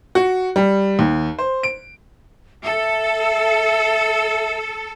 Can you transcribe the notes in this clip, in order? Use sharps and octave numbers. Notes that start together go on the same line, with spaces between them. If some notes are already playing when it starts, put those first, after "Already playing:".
F#4
G3
D#2
C5
D7
A4 E5